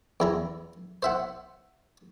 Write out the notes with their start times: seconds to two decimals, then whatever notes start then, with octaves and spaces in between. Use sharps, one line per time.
0.20 E2 E4 A#5
1.03 C5 E5 F#5